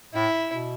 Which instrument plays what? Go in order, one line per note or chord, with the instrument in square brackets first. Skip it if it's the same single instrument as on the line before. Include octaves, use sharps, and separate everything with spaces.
[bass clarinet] A2 [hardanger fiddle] E4
[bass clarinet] B2